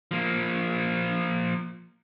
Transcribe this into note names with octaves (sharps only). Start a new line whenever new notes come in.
F3 A#3